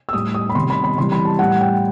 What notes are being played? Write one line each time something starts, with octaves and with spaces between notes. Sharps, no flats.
E6
A2 G3 D#6
D#6
B5
C3 D#3 G3 C6
B5
B5
C3 E3 G3 C6
B5
A5
A2 G3 F#5
G5